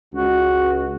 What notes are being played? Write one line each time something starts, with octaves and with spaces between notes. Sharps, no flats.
C#2 F#4